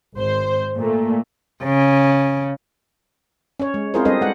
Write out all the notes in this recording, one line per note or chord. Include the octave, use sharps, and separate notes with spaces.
G#1 C5
A#2 A3
C#3
C#4 C#5
G#3
C4 E4 F4 G#4 A#4 C5
G3 C4 D4 A4 B4 D#5
G#3 F#5